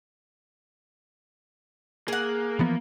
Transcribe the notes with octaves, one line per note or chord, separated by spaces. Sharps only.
A#3 G#4 F#5
E3 F3 B3